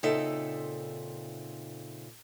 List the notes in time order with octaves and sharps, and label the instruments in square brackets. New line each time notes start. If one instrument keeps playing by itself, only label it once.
[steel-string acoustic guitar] A#2 C#3 C4 D#4 A4 E5